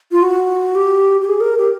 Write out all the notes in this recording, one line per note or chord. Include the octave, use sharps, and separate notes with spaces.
F4
F#4
G4
G4
G#4
A#4
G4